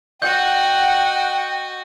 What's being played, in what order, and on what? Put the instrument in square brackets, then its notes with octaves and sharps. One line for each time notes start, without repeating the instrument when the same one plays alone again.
[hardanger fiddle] F#4 D#5 [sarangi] F#5 [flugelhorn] G5 [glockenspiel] G6